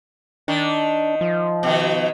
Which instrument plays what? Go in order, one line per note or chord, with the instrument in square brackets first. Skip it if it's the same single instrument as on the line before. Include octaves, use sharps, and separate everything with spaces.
[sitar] D#3 [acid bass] D4
[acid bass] F3
[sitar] B2 D#3